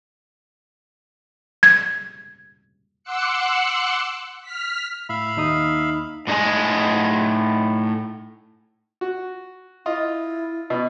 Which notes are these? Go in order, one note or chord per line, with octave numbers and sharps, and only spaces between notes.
G#6
F#5 C6 D6 E6 F#6 C#7
F6 B6
A2 E5 F5 B5
D#2 D#4 D#6
A2 D4 D#4 D#5 G#5
F#4
E4 F4 D#5
B2